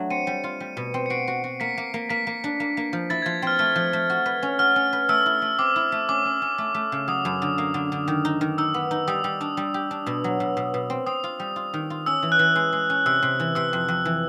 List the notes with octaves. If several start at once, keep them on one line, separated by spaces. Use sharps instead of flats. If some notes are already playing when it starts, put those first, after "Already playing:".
Already playing: F#3 A3 D4
C4 C#7 D#7
G3
F4
G3
B2
C4
C#7
F#4 C7 D7
F#4
F#4
A#3 B6 C#7
A#3
A#3
A#3 B6
A#3
D4
A#3
A#3
F3
E4 A6
G#6
F3
C4 F6
A3 F6
F3
A3
F#4
B4
C#4
F#4 F6
C#4
B4
A3 E6
E4
A3
C4 D6
E4
A3
C#4 D6
C#4
C#4
A3
A3
C#3
F#3 D#6
F#2
D3
A#3
D3
D3
D#3
D#4
D#3
D#4 E6
B3
D#4
G3 D#6
G3
D4
G3
G4
D4
B2 E6
F#3
B2
B2
B2
C4
C4 D#6
F4
G3
F4
D#3
F4
C#4 E6
E3
F#6
E3
G#3
G#3
C#4
C3 E6
C3
E3
C3 E6
F2
F2
E3